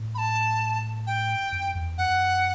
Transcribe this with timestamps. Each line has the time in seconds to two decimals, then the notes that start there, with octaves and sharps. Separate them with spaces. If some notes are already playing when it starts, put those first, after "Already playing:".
Already playing: A2
0.15 B5
0.18 A5
1.07 G5
1.52 F#2
1.75 E2
1.98 F#2 F#5